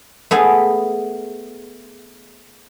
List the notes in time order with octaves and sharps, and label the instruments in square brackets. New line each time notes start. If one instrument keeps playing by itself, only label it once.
[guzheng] A3 B3 G#4